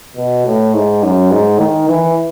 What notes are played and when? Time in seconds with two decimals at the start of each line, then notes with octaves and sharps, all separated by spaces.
0.16 B2
0.46 A2
0.74 G#2
1.03 F#2
1.31 G#2
1.59 D#3
1.89 E3